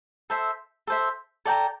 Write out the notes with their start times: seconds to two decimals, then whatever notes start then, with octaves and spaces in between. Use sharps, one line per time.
0.30 A4 C5 E5
0.87 A4 C5 E5
1.45 A4 D5 G5 A#5